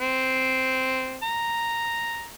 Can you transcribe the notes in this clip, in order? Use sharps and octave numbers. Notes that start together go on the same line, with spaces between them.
C4
A#5